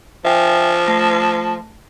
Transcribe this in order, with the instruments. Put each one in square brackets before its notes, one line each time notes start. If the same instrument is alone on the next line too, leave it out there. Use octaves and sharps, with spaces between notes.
[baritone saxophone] F3 [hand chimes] E5 G5 G#5
[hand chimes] A3 A5 A#6